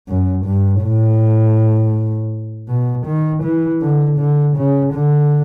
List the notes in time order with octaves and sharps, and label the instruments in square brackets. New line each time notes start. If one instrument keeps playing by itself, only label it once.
[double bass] F#2
G2
A2
B2
D#3
E3
D3
D3
C#3
D3